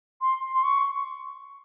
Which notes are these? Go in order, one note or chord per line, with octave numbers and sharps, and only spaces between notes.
C6
C6
C#6